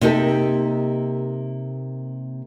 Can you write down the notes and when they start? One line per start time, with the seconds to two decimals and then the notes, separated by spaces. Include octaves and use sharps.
0.01 C3 A#3 D#4 G4 A4